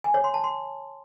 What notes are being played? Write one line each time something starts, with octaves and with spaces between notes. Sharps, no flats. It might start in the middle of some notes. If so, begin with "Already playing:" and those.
G#5
C#5
C6
A5
C6